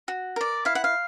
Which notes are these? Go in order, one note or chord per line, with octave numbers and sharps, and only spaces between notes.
F#4
A#4 D5
E4 F5
F#5
F5